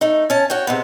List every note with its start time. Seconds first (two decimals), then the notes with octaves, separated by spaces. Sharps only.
0.01 A3 D#4
0.30 C#4 A5
0.50 F#4 C#5 G5
0.67 C3 G#3 B3